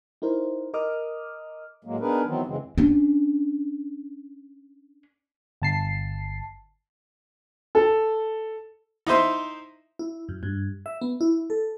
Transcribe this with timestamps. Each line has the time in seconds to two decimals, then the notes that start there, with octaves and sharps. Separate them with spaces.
0.22 D#4 E4 A#4 C5
0.74 A#4 D#5 D6 D#6 F6
1.84 A2 F#3 G#3 A#3
2.00 B3 D4 D#4 G#4 A#4 B4
2.25 D#3 E3 F#3 B3 C4
2.46 F#2 C#3 E3 G#3 C4
2.78 C#4 D4
5.62 G1 A5 C7
7.75 A4
9.07 D#4 E4 C5 E5
9.99 E4
10.29 F#2
10.43 G2
10.86 E5
11.02 B3
11.21 E4
11.50 A4